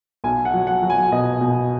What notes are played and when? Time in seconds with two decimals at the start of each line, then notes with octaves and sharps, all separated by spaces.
0.24 B1 G#5
0.45 F#5
0.53 F#3
0.67 F#5
0.83 F#3
0.90 G#5
1.12 B2 D#5
1.41 B2